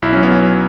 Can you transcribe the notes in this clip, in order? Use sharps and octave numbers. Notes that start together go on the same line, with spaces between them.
B1 E4
F#3 C#4
B3
F#3 C#4